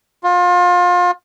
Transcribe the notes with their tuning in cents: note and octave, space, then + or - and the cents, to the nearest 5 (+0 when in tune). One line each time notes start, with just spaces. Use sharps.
F4 +30